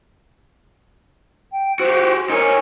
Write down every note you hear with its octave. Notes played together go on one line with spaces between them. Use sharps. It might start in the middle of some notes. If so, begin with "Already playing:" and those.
G5
F#4 G4 C5
D#4 A#4 C#5 G#5